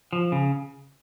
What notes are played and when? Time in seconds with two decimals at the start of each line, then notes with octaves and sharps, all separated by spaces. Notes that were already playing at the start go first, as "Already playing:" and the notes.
0.13 F3
0.32 C#3